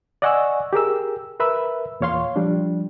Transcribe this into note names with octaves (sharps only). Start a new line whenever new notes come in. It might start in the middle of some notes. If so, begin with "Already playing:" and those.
D5 D#5 F#5 G#5 C#6 E6
G4 G#4 A#4 E6
A#4 B4 E5 B5 E6
E2 A#2 C#5 F5 C6
F3 G3 D4